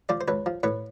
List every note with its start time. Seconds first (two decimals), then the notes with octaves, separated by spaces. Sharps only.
0.09 F3 C5 D5
0.21 C5
0.28 C#2 B4 C#5
0.46 F3
0.63 A2 B4 C#5